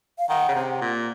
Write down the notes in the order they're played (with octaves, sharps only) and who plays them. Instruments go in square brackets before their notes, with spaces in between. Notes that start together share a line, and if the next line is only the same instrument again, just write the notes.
[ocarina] F5
[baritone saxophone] D#3 [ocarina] F#5
[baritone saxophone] C#3
C3
A#2